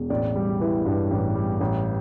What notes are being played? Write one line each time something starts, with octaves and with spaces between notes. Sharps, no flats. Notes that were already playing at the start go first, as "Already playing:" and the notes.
Already playing: E1
A1 D5
G3
E3
G2
A1
G3
A1